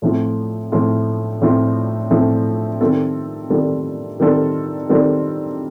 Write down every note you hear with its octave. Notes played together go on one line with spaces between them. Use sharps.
A2 F3 A3 C4 F4
A2 F3 A3 C4 F4
A2 F3 A3 C4 F4
A2 F3 A3 C4 F4
D#3 G3 C4 F4 A4
D#3 G3 C4 F4 A4
D#3 G3 C4 F4 A4
D#3 G3 C4 F4 A4